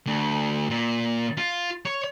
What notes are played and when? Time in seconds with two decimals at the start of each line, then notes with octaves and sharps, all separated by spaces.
0.06 D2
0.70 A#2
1.37 F4
1.85 C#5